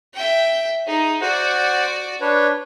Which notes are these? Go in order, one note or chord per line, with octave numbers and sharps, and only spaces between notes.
E5 G5
D#4 G#4
F#4 C5 D5 F#5
D4 B4 C#5